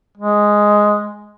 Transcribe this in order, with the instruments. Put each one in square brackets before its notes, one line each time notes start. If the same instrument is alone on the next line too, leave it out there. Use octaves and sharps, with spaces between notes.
[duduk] G#3